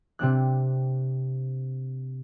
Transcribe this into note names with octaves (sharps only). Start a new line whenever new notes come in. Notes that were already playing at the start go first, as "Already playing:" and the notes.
C3 C4 D4 F#6